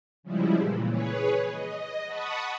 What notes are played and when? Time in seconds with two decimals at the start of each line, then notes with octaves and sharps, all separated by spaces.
0.23 C#3 F3 G3 G#3 E4
0.57 A#2 E3
0.89 G#4 B4 C#5
1.51 D#5
2.06 F#5 A5 B5 C#6 D#6